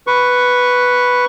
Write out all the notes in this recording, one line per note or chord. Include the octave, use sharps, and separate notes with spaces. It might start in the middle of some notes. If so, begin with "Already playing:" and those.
B4 C#6